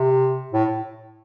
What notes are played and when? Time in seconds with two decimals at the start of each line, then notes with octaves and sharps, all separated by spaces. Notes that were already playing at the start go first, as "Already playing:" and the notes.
Already playing: C3
0.53 A2